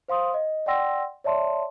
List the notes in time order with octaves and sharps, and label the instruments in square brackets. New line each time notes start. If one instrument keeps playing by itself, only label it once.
[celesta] C5 F5 C6 D#6
D#5
D5 F#5 G5 C6 E6 A#6
C#5 D5 E5 A5 C6